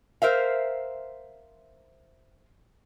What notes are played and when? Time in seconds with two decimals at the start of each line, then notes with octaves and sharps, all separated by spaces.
0.22 A#4 C5 E5 F5